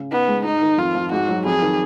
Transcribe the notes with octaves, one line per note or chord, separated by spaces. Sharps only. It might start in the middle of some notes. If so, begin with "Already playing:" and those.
Already playing: C#3
B3 D#4
G#3
G#2 D#4
D#3
F2 F4
F3
G#2 F#4
F#3
F2 G#4
D#3